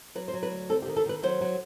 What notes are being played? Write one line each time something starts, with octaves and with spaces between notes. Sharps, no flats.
F#3 B4
C5
F#3
B4
D2
C3 A4
G4
D#3
A4
D#3 B4
F#3 C5
F#3